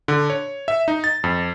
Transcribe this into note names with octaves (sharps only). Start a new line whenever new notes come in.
D3
C#5
E5
D#4
A6
F2